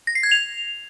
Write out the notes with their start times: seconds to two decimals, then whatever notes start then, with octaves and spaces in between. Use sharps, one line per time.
0.07 A#6
0.15 C7
0.23 G#6
0.31 F7